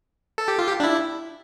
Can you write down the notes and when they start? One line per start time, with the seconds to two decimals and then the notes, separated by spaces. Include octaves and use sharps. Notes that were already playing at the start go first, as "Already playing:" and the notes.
0.38 A4
0.48 G4
0.58 F4
0.68 G4
0.80 D4
0.84 E4